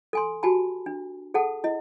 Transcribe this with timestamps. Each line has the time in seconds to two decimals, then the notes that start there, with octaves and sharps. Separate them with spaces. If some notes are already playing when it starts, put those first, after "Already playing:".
0.13 A4 G#5 C6
0.43 F#4 G4 G#5 A5 B5
0.86 D4
1.34 G#4 A4 F#5 A5
1.64 E4 D#5